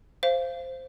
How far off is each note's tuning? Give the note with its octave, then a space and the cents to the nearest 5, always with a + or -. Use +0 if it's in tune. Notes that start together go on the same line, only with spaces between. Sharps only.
C5 +0 F5 -20